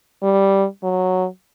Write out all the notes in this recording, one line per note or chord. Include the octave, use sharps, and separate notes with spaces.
G3
F#3